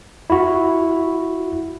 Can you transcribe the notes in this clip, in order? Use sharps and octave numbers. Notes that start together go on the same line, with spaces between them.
E4 F#4